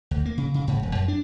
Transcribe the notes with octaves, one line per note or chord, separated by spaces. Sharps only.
D2
A#3
C#3
C#3
G#2
E1
F#2
D4